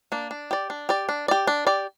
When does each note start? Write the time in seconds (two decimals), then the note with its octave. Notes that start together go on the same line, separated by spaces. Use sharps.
0.12 A#3 D4
0.31 D4
0.51 G4 D5
0.70 D4
0.89 G4 D5
1.09 D4
1.28 G4 D5
1.47 D4
1.67 G4 D5